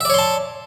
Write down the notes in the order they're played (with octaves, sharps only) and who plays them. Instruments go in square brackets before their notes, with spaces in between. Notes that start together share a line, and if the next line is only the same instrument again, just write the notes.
[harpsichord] E5
D5
C#5
C6
A5